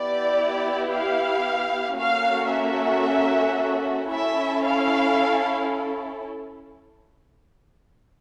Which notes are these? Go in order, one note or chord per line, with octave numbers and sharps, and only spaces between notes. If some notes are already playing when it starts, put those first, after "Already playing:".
Already playing: B3 E4 G4 D5
F5
A#3 C#4 F#4 A4 F5
E5
C#4 E4 A4 E5
F5